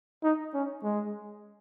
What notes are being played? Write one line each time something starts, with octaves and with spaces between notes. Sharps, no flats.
D#4
C#4
G#3